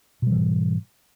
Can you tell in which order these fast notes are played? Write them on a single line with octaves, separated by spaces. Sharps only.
B2 G3 E3 G#2